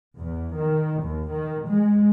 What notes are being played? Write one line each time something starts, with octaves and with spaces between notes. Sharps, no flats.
E2
D#3
D#2
D#3
G#3